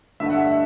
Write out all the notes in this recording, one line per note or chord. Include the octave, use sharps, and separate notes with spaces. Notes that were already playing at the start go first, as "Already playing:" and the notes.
G2 D3 A3 E5
F#5
E5